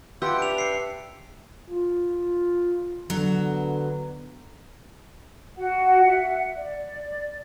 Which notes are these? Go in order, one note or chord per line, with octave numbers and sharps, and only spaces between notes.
F4 G4 B4 E5 F#5 E6 D7
D4 E5 D7 F7
C7 C#7
F4
D3 F#3 B3
F#4 F#5
E5 F#5
D5